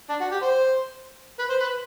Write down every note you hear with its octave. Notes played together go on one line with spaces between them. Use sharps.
D4
F#4
G4
C5
B4
C5
B4